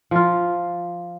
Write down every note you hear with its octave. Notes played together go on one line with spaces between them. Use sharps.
F3 F4